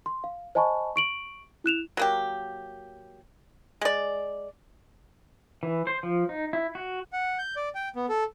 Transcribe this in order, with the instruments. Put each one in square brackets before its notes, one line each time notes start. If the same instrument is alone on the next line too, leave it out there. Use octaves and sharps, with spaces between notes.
[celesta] C6
F5
C5 D#5 G#5 A5 B5 C#6
C#6 D7 F#7
E4 F#6 E7 F7
[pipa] F#3 A#3 G4
G#3 D5
[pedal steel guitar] E3
C5
F3
D#4
E4
F#4
[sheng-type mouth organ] F#5
G6
D5
G5
B3
A4